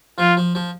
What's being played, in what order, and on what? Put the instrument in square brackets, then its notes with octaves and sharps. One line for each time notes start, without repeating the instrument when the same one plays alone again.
[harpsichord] F3 [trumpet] F4
[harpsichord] F3
F3